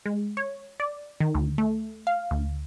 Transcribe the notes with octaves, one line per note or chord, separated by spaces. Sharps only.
G#3
C#5
D5
D#3
D2
A3
F5
D2